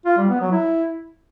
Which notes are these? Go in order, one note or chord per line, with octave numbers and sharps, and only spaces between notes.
F4
G3
B3
F#3
E4